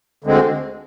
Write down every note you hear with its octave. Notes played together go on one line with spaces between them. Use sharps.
D2 D3 G#3 C4